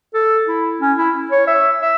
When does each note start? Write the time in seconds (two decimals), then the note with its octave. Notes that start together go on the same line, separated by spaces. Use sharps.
0.14 A4
0.48 E4
0.81 C#4
0.98 E4
1.32 C#5
1.47 E5
1.82 E5